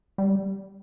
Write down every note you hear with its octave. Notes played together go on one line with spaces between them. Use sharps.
G3